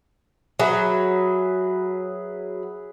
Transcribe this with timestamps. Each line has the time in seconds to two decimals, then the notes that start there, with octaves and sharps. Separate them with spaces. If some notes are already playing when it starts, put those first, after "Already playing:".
0.60 F#3 G#4 B4 E5